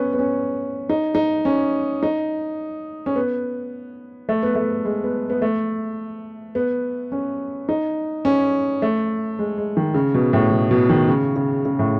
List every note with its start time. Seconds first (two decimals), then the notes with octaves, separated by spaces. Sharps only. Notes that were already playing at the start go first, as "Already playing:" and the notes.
Already playing: B3 C#4
0.13 B3
0.19 C#4
0.89 D#4
1.15 D#4
1.45 C#4
2.03 D#4
3.06 C#4
3.16 B3
4.29 A3
4.43 B3
4.55 A3
4.85 G#3
5.04 B3
5.30 B3
5.42 A3
6.55 B3
7.12 C#4
7.69 D#4
8.25 C#4
8.82 A3
9.39 G#3
9.58 G#3
9.77 D#3
9.94 C#3
10.14 B2
10.33 A2
10.52 B2
10.71 B2
10.89 D#3
11.08 C#3
11.36 C#3
11.65 C#3
11.79 A2